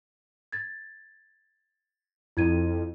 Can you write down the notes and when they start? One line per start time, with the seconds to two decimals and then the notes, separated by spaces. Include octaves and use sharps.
0.52 G#6 A6
2.37 F2 E4 G#6 D#7